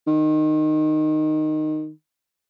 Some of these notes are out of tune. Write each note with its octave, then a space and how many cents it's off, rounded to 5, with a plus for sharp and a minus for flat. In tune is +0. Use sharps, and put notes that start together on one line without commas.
D#3 -15